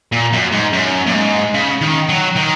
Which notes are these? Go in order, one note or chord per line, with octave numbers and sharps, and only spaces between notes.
A#2
F#2
G#2
F#2
A#2
G#2
C#3
D#3
F#3
D#3